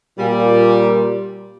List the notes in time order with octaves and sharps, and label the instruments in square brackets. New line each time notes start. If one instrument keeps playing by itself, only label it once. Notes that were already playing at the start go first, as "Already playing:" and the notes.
[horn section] A#2 G3